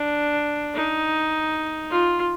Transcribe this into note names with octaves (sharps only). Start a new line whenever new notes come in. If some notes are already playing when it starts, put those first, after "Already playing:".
Already playing: D4
D#4
F4